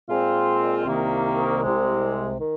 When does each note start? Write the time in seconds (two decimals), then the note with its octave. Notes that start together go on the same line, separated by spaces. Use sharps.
0.08 A#2 G#3 C4 F4
0.86 C2 C3 D#3 A#3
1.63 C2 C3 G#3
2.41 D#3